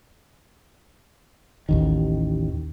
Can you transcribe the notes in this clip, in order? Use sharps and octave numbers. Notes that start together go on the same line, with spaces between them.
A1 D#2 D#3